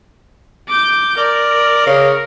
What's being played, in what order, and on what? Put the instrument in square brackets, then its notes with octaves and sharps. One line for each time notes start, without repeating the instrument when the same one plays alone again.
[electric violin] D6 G6
[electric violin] A#4 [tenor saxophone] D5
[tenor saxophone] C#3